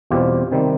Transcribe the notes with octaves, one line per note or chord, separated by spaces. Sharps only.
E2 B2 G3 C4 F4 G4
C3 D#3 G3 C4